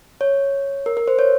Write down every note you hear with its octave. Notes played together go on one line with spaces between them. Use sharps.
C#5
A#4
A#4
C5
C#5